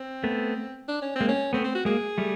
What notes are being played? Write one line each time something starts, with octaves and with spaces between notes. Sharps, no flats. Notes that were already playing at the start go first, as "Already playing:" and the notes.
Already playing: C4
A3 B3
D4
C#4
C4
G#3 A#3
C#4
A3 B3 C4
C4
F#4
G#3 A#3 G#4
G3 A3